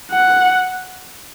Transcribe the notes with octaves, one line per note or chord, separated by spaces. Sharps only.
F#5